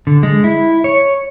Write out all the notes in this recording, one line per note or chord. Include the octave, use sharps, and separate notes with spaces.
D3
G#3
E4
C#5